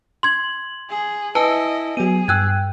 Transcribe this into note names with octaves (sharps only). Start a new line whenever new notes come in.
C6 G#6 F#7
G#4
E4 B4 D#5 G#5 A5 E6
F#3 B3 G#4 D#7
G2 G5 E6 F#6 G#6